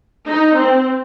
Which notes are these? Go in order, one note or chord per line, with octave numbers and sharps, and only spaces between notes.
D#4
C4